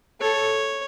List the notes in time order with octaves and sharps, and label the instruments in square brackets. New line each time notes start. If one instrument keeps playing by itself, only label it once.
[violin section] A4 [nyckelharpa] C#5